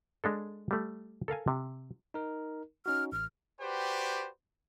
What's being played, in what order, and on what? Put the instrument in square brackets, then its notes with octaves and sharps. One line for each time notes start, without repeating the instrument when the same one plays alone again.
[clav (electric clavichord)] G#3 D4 A4
G3 A3
A4 A#4 F5 G#5
C3
[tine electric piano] D#4 A#4
[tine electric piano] C#4 D#4 F#4 [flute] F6
[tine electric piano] A1 [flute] F6
[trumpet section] F#4 G4 B4 C5 D5 G5